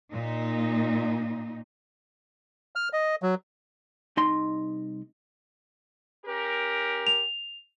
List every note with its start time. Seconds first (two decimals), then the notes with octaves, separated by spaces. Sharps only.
0.13 A#2 D#4
2.76 F6
2.93 D#5
3.22 F#3
4.17 C2 D#4 D#5 C6
6.26 C#4 G4 A#4
7.07 F7